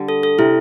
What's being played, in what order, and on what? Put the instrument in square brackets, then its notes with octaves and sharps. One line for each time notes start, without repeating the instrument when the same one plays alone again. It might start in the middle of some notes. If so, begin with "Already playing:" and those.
Already playing: [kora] D3 G3
[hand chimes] A4
A4
[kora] C3 [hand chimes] E4